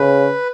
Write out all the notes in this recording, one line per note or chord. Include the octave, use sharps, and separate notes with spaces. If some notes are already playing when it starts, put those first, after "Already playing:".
Already playing: C#3 B4